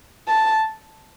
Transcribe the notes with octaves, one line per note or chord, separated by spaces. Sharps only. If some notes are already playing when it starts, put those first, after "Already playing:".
A5